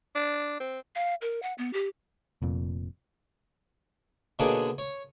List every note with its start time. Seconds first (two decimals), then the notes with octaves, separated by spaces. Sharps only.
0.15 D4
0.60 C4
0.95 F5
1.22 A#4
1.43 F#5
1.58 B3
1.73 G4
2.42 F1 F2 A#2
4.39 B2 D3 A#3 C#4 D4 G#4
4.78 C#5